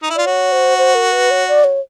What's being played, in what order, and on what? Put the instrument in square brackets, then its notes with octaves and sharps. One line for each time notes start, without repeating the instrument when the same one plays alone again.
[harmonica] D#4
E4
[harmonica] F4 [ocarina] D5
[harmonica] F#4 [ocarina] C#5
[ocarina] C5
C5
A#4
B4
C#5
D5
C#5